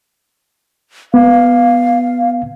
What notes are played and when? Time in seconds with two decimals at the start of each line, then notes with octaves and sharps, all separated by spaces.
1.14 B3 F5